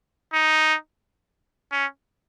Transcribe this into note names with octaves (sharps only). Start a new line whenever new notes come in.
D#4
C#4